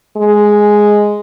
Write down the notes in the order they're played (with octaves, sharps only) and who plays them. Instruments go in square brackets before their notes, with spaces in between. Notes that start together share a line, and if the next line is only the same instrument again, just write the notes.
[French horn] G#3